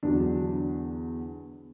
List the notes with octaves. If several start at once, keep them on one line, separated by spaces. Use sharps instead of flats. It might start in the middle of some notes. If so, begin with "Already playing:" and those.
E2 D3 F#3 D4